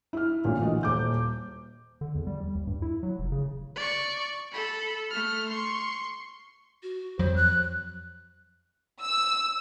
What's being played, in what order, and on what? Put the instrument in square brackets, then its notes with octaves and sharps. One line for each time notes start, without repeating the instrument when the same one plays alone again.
[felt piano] E4 F6
A1 A#2 D3
E3 F#4 D#5
D#1 D6 G6
[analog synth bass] D3
E2
G3
G3
D#2
G2
E4
F#3
F1
C#3
[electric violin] D5 C#6
A4 B5
A3 F6
C6 C#6
[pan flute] F#4
[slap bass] F2 F#3 [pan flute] C5
[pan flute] F#6
[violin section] E6